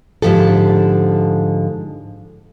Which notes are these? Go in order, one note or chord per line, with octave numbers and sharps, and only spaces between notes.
G#2 D3 F3 G4 A4